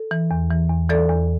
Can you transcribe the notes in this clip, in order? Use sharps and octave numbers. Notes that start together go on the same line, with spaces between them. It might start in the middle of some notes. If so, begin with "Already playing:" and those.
Already playing: A4
E3
E2
E3
E2
E3 A4 D5
E2